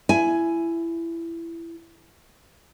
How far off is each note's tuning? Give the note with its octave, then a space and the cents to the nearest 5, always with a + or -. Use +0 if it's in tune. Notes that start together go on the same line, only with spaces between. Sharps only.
E4 +20 G#5 +10